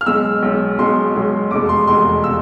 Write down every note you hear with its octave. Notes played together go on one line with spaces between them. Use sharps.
F6
B1 B2 G#3 E6
B1 B2 G#3
B1 B2 G#3 C6
B1 B2 G#3
F1 E2 B2 G#3 D6
C6
F1 E2 B2 G#3 C6
B2 E6